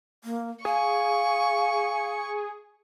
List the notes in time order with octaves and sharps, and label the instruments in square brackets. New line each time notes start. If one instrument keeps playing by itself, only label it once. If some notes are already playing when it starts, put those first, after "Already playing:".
[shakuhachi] A#3
[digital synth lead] G#4 [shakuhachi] F5 [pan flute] G#5 [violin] C#6